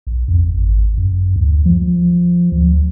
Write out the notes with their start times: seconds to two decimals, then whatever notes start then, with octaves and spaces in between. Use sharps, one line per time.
0.07 A#1
0.28 F2
0.47 G#1
0.98 F#2
1.36 D2
1.66 F3
2.52 D2